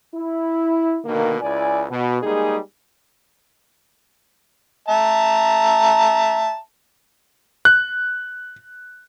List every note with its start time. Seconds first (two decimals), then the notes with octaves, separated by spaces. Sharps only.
0.14 E4
1.05 B2 D3 D#3 A#3
1.42 C#2 E4 D5 G#5
1.90 B2
2.23 G3 G#3 A#3 D#4 G#4
4.88 E5 A5 A#5
7.65 F#6